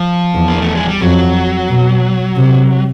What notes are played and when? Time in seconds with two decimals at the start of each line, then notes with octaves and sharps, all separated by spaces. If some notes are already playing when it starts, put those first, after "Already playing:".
Already playing: F3
0.34 E2
0.48 A#3
0.61 A3
0.75 G#3
0.88 G3
1.01 F2 F#3
1.69 B2
2.36 C3